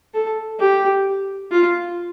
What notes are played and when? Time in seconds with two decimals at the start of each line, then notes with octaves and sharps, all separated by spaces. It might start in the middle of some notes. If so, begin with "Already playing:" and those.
0.14 A4
0.60 G4
1.52 F4